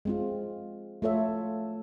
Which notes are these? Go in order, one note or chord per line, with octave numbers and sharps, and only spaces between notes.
G#3 C4 F4
A3 F4 A4 C#5 E5